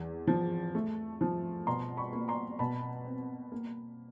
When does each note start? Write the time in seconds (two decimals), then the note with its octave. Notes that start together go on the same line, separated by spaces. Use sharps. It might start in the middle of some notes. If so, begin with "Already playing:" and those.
Already playing: E2
0.27 F3
0.75 A3
1.21 F3
1.67 B2 A#5 C6
1.97 B5 C#6
2.13 A#3
2.28 A#5 C6
2.59 B2 A5 B5
3.06 C4
3.52 A#3